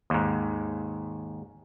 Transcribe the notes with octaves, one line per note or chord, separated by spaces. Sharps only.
D#2 G#2